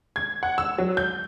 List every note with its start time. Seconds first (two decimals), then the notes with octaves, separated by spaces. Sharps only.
0.16 G#6
0.43 F#5
0.58 E6
0.78 F#3
0.97 G6